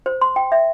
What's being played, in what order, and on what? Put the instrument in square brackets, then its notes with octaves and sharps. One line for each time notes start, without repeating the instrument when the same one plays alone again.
[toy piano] C5
C6
G5
E5